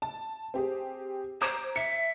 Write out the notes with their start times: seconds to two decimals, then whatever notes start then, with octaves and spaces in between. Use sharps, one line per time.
0.02 A5
0.54 C4 G4 G#4
1.41 C5 A#5 D6 G#6
1.76 E5 C#7